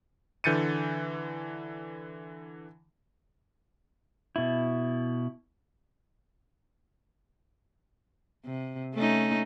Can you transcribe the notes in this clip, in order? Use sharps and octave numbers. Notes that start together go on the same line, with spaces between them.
D3 E3 G6 A6 C#7 D#7
B2 E4
C3
A3 C#4 D#4